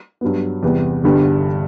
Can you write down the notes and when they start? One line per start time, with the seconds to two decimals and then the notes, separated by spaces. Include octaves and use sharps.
0.21 G2 F#3 B3
0.63 E2 C3 G3 B3
1.04 G1 G2 D3 G3 B3